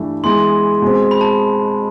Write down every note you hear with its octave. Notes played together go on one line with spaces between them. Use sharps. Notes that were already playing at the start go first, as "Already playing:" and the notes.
Already playing: G2 E3 A3
E3 G#3 B3 C6
B2 G#3 C4
B5
A5